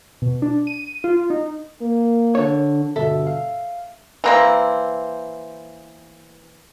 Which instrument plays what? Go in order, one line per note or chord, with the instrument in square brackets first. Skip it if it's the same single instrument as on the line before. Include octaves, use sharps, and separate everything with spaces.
[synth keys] B2
D4
D#7
F4
D#4
[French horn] A#3
[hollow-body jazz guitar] D3 C#5
[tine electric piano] G2 B2 D3 [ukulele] A4 E5
[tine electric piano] F5
[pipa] E3 A#3 C4